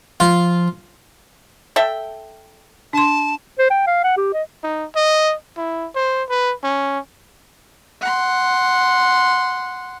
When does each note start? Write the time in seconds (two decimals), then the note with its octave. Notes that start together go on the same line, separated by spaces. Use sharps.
0.20 F3 F4
1.76 A4 E5 G5
2.93 D4 A5 C6
3.59 C5
3.71 G5
3.87 F5
4.04 F#5
4.17 G4
4.34 D#5
4.64 D#4
4.96 D#5
5.57 E4
5.95 C5
6.29 B4
6.64 C#4
8.01 F#5 C6